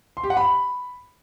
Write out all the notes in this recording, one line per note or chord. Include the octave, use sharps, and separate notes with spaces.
C6
G4
F#5
B5